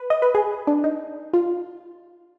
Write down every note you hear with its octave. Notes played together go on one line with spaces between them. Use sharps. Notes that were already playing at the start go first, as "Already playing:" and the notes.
Already playing: B4
D#5
B4
G#4
D4
D#4
F4